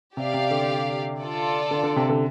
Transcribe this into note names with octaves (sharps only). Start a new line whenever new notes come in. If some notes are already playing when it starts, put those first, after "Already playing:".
C3 G4 D5 F5
C3
D3
F4 A4 D5
D3
D3
C3
D3